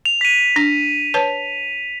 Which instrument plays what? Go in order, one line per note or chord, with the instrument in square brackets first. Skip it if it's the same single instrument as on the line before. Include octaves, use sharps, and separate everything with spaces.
[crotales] F7
B6 D#7
[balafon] D4
B4 C#5 A5